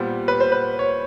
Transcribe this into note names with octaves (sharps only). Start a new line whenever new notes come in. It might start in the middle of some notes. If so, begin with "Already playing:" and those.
Already playing: A#2 G3 B3 C5
B4
C5
B4
C#5